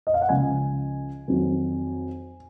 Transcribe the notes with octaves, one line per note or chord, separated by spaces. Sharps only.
D#5
F5
F#5
C#2 C#3 F3 G#3 G#5
F2 D#3 F#3